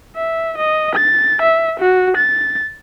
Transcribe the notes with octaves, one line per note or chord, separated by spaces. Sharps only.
E5
D#5
A6
E5
F#4
A6